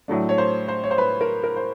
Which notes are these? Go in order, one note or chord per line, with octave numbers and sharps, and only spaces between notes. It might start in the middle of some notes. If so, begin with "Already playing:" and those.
A2 F#3 A3 D4
C#5
C5
C5
C#5
C5
B4
A#4
A#4
C5